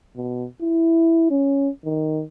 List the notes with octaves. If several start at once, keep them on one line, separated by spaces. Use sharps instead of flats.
B2
E4
C#4
D#3